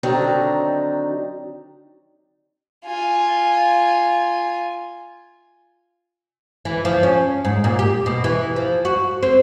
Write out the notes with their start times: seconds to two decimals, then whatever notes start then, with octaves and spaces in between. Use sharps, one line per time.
0.03 D3 D#3 F#3 C4 D4 D#4
2.85 F4 G#5
6.65 E3
6.85 F3
7.03 C#4
7.45 G#2
7.64 A#2
7.79 G4
8.06 B2
8.24 E3
8.56 F3
8.85 F#4
9.23 C4